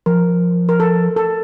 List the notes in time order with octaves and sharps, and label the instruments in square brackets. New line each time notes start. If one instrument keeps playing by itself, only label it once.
[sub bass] F3 [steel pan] A#4
[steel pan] A#4
A4
A4